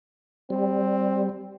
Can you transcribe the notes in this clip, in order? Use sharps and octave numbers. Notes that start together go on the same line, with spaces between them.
G3 C4